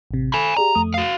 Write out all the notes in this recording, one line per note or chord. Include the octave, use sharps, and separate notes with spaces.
A1 C3
A4 G#5 B5
G4 G#4 D5 A#5
F2 A3 D#6
F#4 F5